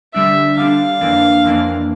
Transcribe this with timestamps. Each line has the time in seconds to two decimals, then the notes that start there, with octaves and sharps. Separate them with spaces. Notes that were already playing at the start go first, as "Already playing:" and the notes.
0.14 D3 G3 D4 E5
0.57 D3 G3 D4 F5
1.01 F2 E3 A#3 D4
1.44 F2 E3 A#3 D4